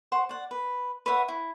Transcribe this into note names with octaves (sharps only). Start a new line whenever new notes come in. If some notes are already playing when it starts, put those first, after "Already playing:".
C5 F#5 C#6
D5 F#5
B4
B4 C#5 E5 F#5
E4